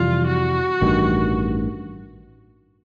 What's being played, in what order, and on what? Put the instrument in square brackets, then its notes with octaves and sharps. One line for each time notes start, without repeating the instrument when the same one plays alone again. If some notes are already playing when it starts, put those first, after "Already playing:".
Already playing: [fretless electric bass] F2 C3 E3 G3 [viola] F4
[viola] F#4
[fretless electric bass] A1 G2 D#3